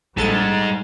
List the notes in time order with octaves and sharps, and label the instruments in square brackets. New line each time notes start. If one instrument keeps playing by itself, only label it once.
[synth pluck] A#1 A4 A6 [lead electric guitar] G#2 G#3 [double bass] G3